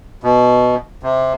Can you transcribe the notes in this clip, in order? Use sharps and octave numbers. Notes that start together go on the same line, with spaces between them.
B2
C3